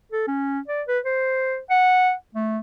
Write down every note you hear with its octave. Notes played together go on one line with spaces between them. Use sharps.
A4
C#4
D5
B4
C5
F#5
A3